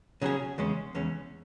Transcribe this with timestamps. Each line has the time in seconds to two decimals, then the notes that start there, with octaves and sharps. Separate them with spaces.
0.22 C#3 F#3 C#4 G#4
0.58 E2 C#3 G#3 C#4
0.95 E2 C#3 G#3 C#4